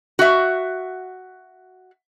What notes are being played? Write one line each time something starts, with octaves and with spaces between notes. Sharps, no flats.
F#4 E5